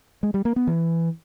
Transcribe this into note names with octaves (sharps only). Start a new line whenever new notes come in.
G#3
G3
A#3
B3
E3